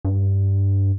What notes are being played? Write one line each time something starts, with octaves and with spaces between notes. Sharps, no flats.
G2